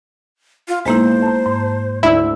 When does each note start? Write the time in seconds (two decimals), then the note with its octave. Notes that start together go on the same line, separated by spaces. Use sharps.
0.68 F4
0.85 B1 G#3 A#3 E4 C5
1.22 A5 A#5
1.46 G#2
2.03 D2 D4 E4 E5 E6